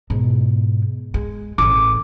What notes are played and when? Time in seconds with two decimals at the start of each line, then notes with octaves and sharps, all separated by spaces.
0.10 G#2 B2
1.14 G#3
1.58 A1 D3 D6